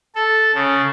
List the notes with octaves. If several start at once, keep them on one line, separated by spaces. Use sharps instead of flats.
A4
C#3